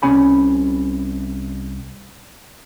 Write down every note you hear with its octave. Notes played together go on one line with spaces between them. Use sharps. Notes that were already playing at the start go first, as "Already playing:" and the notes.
C2 C#4 G#5 B5